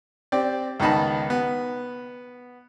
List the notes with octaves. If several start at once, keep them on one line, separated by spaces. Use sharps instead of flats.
C4 G4 D5
C#2 D#3 B3 D#4 A5 B5
B3